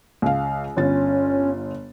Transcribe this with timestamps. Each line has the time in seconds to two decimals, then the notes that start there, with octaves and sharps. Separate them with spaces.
0.22 C#2 F5
0.77 G1 C#4 F4 A6